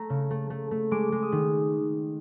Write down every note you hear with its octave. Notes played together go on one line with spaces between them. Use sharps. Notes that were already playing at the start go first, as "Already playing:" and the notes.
Already playing: A3 A#5
C#3
A3
A3
A3
G#3 D6
G#3
D#6
D#3